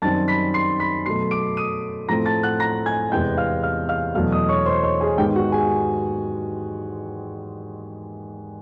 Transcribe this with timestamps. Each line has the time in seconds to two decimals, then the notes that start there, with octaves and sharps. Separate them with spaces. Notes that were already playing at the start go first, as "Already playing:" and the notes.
0.02 F#2 D#3 G3 C4 A5 A6
0.28 B5 B6
0.54 C6 C7
0.80 B5 B6
1.06 B2 F#3 A3 C6 C7
1.31 D6 D7
1.57 D#6 D#7
2.08 A2 F3 A3 C4 A#5 A#6
2.26 A5 A6
2.43 F#5 F#6
2.60 A#5 A#6
2.86 G#5 G#6
3.12 E2 C3 E3 G#3 B3 G5 G6
3.37 F5 F6
3.63 F5 F6
3.89 F5 F6
4.15 E2 B2 F#3 A3 F5 F6
4.32 D#5 D#6
4.49 C#5 C#6
4.66 C5 C6
4.84 C#5 C#6
5.01 G#4 G#5
5.18 G#2 D#3 G#3 B3 G4 G5
5.36 F#4 F#5
5.52 G#4 G#5